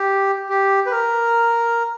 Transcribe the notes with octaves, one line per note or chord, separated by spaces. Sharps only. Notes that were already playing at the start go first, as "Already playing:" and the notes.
Already playing: G4
G4
B4
A#4